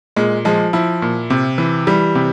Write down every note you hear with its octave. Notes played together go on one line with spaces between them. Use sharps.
A#2 G#3
F3 G#3
F3 E4
A#2
C3
E3
E3 G3
C3